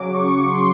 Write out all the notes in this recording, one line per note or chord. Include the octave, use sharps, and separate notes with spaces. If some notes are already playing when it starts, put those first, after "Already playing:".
Already playing: C#3 F#3 D6
C#6
C6